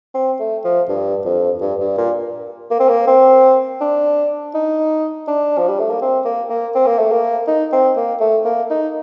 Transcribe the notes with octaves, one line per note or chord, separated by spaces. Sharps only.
C4
A3
F3
G2
F2
G2
G2
A#2
A#3
C4
A#3
C4
D4
D#4
D4
F3
G3
A3
A#3
C4
A#3
A#3
C4
A#3
A3
A#3
D#4
C4
A#3
A3
A#3
D#4